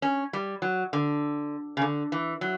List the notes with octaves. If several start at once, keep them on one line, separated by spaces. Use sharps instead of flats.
C#4
G3
F#3
D3
C#3
D3
E3
F#3